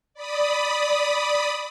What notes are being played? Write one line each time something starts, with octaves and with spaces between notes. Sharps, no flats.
D5 B5 D#6